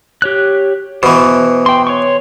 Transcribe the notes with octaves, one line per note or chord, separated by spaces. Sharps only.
G4 C#5 F#6
B2 E3 C5
G5 C6
C#5 C6 C#6